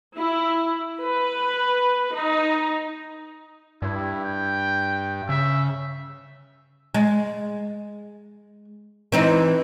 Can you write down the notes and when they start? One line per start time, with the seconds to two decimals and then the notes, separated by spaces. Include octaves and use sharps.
0.18 E4
1.02 B4
2.15 D#4
3.82 G2 E4
4.24 G5
5.29 C#3 E5
6.94 G#3
9.12 E3 C4 D#4